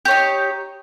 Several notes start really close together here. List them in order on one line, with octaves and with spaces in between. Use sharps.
G4 C#5 D#4